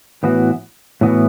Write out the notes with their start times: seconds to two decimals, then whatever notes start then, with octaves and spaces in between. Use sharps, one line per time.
0.23 A2 E3 B3 F#4
1.01 A2 E3 B3 F#4